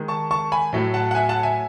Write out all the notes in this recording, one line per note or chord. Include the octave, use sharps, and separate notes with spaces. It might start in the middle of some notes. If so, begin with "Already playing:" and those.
Already playing: D#3 G#3
A5 C#6
A5 C#6
G#5 B5
A2 F#3 A3
F#5 A5
F#5
E5 G#5
F#5 A5
E5 G#5